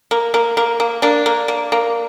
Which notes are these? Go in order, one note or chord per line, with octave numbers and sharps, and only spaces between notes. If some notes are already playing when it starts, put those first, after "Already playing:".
A#3
A#3
A#3
A#3
A#3 D4
A#3
A#3
A#3